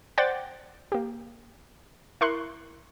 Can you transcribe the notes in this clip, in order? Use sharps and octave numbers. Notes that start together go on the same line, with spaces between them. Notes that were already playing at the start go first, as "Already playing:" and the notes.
C5 D5 F#5 G5 A6
A#3 G4
E4 A#4 C6 C#6 F#6